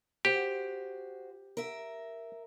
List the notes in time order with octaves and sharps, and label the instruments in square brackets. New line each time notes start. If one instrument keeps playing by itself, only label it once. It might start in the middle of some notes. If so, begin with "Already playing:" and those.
[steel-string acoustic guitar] F#4 C5 [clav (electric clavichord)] G4
[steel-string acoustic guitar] A#4 E5